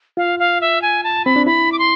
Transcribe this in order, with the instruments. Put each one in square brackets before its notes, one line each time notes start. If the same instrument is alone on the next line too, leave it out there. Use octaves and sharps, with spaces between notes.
[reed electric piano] F4 [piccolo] F5
[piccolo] F5
E5
G#5
A5
[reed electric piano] C4 [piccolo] B5
[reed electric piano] D4
[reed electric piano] E4 [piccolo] B5
[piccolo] D6
C6